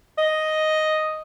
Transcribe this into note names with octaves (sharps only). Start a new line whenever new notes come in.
D#5